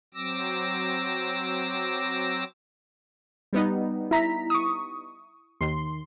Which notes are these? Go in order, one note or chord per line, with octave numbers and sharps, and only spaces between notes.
F#3 C4 D6 E6 A#6
G3 B3 D#4
E4 A#5 B6
C#6 D#6
D#2 C6